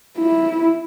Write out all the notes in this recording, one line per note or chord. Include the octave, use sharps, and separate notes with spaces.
E4